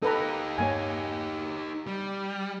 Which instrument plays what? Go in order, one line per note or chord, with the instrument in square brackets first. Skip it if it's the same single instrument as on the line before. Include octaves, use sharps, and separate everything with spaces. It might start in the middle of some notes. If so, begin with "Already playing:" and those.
[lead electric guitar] D#4 G4 [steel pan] A4 B4 A#5
[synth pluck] G2 A#3 C#5 [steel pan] G#5
[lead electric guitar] G3